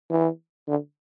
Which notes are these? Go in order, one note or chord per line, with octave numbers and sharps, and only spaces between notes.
E3
D3